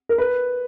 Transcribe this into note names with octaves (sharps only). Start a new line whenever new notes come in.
A#4
B4